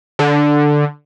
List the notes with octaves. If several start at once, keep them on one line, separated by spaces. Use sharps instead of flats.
D3